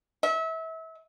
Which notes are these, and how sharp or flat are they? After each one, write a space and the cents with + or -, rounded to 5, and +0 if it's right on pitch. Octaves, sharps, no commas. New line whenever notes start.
E5 -30